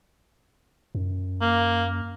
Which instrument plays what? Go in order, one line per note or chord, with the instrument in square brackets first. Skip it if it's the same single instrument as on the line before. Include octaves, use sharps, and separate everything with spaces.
[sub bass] F#2
[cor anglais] A#3